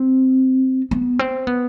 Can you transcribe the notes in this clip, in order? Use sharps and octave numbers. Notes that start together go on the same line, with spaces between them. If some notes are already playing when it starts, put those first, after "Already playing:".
Already playing: C4
B3
C4
B3